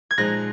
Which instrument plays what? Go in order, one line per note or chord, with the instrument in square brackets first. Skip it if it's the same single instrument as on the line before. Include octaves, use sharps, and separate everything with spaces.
[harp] G#6
[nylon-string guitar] A#2 F3 G#3 D#4 [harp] F#6 A#6